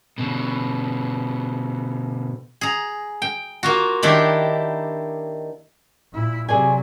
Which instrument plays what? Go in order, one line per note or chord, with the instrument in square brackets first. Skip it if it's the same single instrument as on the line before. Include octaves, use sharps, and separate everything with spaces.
[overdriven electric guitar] B2 D3
[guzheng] G#4 A#5
G5
A#3 F4 F#4
D#3 D4 E4 G4
[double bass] A#2 E4
[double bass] C3 F#3 [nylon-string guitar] G#4 D5 G#5